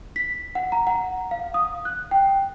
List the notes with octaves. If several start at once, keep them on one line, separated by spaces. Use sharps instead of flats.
B6
F#5
A#5
F#5
F5
D#6
F#6
G5